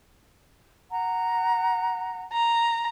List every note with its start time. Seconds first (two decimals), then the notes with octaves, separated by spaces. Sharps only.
0.90 F#5 A#5
2.33 A#5